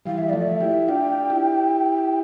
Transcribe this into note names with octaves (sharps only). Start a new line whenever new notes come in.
E3 G3 F5
G3 E5
F3 A3 D5
E5
E4 G4
D4 F4 G5
E4 G4